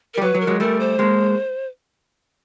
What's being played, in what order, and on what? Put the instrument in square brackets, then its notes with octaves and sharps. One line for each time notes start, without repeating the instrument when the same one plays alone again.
[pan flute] A#4
[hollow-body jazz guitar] G3
[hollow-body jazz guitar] F#3 [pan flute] B4
[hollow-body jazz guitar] F#3
[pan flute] A#4
[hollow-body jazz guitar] F#3 G#3
[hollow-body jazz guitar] G3 A3 [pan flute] A#4
[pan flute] C5
[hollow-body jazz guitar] G#3 A#3